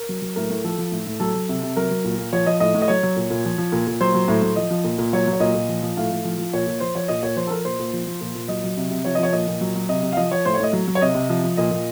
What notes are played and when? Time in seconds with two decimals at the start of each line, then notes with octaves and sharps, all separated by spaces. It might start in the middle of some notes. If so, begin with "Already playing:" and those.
Already playing: A#4
0.09 F#3
0.22 F#3
0.36 A2 A#4
0.50 A2
0.64 F3 A4
0.78 F3
0.92 A2
1.06 A2
1.20 F#3 A4
1.35 F#3
1.49 C3
1.63 C3
1.76 F#3 A#4
1.91 F#3
2.04 A#2
2.18 A#2
2.33 F3 C#5
2.46 F3 D#5
2.60 A2 D#5
2.75 A2
2.82 D#5
2.88 F#3 C#5
3.03 F#3
3.16 A#2
3.30 A#2
3.45 F3
3.58 F3
3.72 A#2
3.87 A#2
4.01 F#3 C5
4.14 F#3
4.28 A2
4.42 A2
4.56 F3 D#5
4.70 F3
4.84 A#2
4.98 A#2
5.13 F#3 C#5
5.27 F#3
5.33 C#5
5.40 A#2 D#5
5.55 A#2
5.68 F3
5.83 F3
5.97 A2 F5
6.11 A2
6.24 F3
6.38 F3
6.53 A#2 C#5
6.67 A#2
6.80 F3 C5
6.95 F3 C#5
7.08 A#2 D#5
7.23 A#2 C#5
7.36 F3 C5
7.47 A4
7.50 F3 A#4
7.65 A#2 C5
7.79 A#2
7.93 F3
8.07 F3
8.21 A#2
8.35 A#2
8.48 F#3 D#5
8.64 F#3
8.77 C3
8.91 C3
9.05 F3 C#5
9.15 D#5
9.19 F3 C#5
9.32 A#2 D#5
9.47 A#2
9.61 F#3
9.76 F#3
9.89 C3 D#5
10.03 C3
10.12 F5
10.17 F3 D#5
10.32 F3 C#5
10.45 A2 C5
10.54 C#5
10.60 A2 D#5
10.73 F#3
10.88 F#3
10.95 C#5
11.02 C3 D#5
11.15 C3
11.29 F3
11.44 F3
11.57 A#2 D#5
11.71 A#2